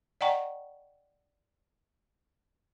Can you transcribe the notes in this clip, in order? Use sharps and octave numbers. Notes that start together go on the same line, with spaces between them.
D5 D#5 F#5 G5 A#5 C#6